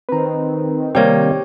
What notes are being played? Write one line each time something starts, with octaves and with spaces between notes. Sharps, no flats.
D#3 C4 B4 A#5
C3 G3 A#3 G4 C#5 G5